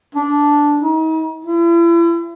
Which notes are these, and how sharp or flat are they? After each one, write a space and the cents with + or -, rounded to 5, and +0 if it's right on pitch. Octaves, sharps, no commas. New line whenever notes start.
D4 -10
D#4 +40
E4 +40